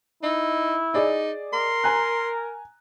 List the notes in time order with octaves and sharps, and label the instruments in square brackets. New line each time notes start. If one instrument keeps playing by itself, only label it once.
[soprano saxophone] D#4 [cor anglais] E4
[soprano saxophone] D#4 [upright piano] G#4 D5 D#5
[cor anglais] A#4 [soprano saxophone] C6
[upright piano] G#5 A#5 F#6